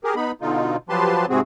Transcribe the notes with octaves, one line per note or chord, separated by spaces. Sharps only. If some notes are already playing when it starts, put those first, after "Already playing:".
G4 G#4 A#4
B3 D#4 B5
B2 D3 D#4 F4
F3 F#3 G4 B4 A5 C6
G#2 C3 C4 F#4 G#4